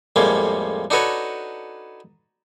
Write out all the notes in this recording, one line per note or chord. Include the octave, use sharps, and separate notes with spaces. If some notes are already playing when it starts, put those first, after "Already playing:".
F2 A2 G3 G#3 A#3
D4 D#4 F#4 A4 B4 C#5